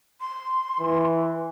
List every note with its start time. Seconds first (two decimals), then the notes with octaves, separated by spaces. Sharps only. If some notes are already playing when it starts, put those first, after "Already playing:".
0.20 C6
0.80 E3